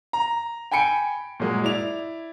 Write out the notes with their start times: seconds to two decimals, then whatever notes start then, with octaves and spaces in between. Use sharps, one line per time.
0.13 A#5
0.71 G5 G#5 B5 C#7 D7
1.40 A#2 F#3 G#3
1.64 E4 D5 F7